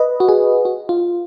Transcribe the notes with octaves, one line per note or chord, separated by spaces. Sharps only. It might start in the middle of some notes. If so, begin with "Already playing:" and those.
Already playing: B4 D#5
F#4
G#4
F#4
F4